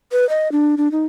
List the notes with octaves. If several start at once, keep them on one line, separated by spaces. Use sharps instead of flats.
B4
D#5
D4
D4
D#4